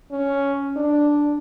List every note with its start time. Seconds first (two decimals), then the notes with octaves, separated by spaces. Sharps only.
0.12 C#4
0.76 D4